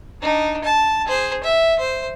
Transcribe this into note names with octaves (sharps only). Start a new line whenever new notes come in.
D4 D#4
A5
G#4 C5
E5
C5